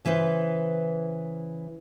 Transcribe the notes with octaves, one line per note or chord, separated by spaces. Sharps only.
C#3 E3 B4 C5